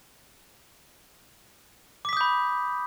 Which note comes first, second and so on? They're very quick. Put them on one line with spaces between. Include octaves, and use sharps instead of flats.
D6 B6 D#6 G6 B5